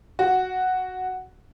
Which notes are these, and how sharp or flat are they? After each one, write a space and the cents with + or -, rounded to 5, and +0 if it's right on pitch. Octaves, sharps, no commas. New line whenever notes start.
F#4 +0